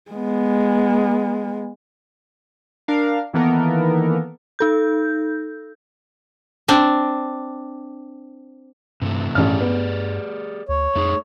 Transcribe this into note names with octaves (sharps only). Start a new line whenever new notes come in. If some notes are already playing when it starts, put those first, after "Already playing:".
G#3 B3
D4 A#4 F5
D#3 E3 A#3 B3 A4 A#4
D#4 A4 G6
C4 D4
G2 C3 E3 A3
A1 G2 G4 G#4 D5 F6
B3
D2 C#5
F2 A3 D#4 G#4